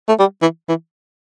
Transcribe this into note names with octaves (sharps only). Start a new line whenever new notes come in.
A3
G3
E3
E3